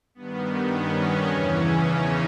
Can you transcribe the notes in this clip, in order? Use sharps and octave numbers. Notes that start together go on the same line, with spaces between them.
G2 D#3 B3
B3
C#4
E2 C#3 E3
D#4